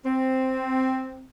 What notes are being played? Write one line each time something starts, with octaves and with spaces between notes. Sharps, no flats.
C4